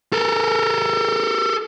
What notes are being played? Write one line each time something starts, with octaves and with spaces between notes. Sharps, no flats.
A4 A#4